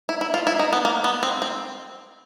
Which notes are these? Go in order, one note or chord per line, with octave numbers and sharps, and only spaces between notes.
E4
E4
F4
E4
D#4
B3
A#3
B3
C4
C4